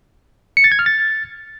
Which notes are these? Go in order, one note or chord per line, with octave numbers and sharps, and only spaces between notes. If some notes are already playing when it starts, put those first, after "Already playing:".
C#7
A6
G#6
F6
A6